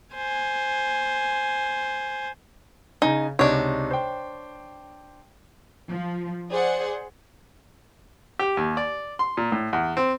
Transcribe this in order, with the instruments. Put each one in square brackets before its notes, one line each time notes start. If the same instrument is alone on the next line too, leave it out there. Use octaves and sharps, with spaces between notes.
[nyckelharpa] C5 G#5
[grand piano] C#3 G#5 [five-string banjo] D#4
[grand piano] C#2 C3 D#4 [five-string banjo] D4 C#5
[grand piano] C5 G5
[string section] F3
G#4 C5 D5 F#5
[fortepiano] G4
D#2
D5
C6
A#2
A2
E2
C4